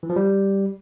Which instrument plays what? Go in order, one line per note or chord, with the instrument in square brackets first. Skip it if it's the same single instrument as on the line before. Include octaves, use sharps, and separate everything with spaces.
[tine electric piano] E3
F3
G3